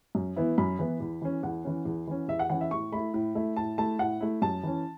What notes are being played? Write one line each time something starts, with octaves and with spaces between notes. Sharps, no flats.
F#2
E3 B3 E4
F#2 B5
E3 B3 E4
E2
E3 C#4
E2 F#5
E3 C#4
E2
E3 C#4
E2 E5
F#5
E3 C#4 F#5
E5
A2 C#6
A3 E4 B5
A2
A3 E4
A2 A5
A3 E4 A5
A2 F#5
A3 E4
F#2 A5
E3 C#4